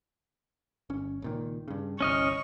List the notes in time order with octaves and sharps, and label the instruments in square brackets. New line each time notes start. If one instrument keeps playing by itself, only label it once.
[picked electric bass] G1 C#4
C#2 A#2 D#3
G2 C#3
[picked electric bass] G1 C2 [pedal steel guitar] C#4 D#5 F6 [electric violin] C#6